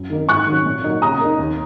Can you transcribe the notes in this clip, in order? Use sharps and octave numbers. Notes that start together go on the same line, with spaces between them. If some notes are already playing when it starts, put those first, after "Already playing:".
Already playing: F#2
D#3 A#3 D#4
G#2 C#6 F#6
D#3 F#3 C#4
A#2
F#3 A#3 D#4
C#3 A#5 D#6
A#3 D#4
D#2